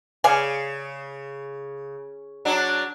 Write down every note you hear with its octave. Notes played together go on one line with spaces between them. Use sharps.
C#3 D5 F5 G#5
F#3 D4